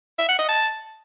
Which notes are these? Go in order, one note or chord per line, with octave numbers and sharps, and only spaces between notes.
E5
F#5
D#5
A5